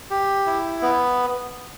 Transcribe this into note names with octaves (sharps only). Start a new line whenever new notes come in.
G4
E4
B3